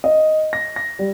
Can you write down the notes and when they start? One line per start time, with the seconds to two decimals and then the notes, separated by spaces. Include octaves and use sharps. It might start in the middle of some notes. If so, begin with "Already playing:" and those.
0.04 D#5
0.53 A#6
0.76 A#6
0.99 G3